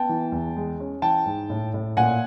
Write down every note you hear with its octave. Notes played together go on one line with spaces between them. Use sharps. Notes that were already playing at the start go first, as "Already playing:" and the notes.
Already playing: B3 G5 A5
E3
E2
G#3
C#4
E3 G5 A5
G#2
A2
A2
A#2 F#5 G#5